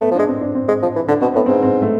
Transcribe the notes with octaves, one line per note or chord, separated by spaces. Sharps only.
A3 B3
F3
D4
G#3
C4
D4
C4
G#3
F3
E3
D3 D4
B2 C4
A2 B3
G#2 C4
C4
A3